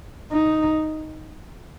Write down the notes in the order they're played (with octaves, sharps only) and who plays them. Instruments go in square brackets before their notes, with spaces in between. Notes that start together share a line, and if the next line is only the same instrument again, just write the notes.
[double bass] D#4